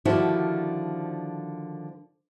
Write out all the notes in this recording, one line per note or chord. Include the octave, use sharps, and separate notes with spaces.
D3 D#3 F3 G3 E4 F#4